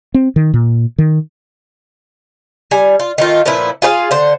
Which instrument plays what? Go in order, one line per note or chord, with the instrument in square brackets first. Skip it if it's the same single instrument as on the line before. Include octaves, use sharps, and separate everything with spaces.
[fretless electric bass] C4
D#3
A#2
D#3
[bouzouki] G3 G#5
F4
D#3 A3 F4
A#2 F3 B3 E4
F4 G#4 C5 F5
D3 C5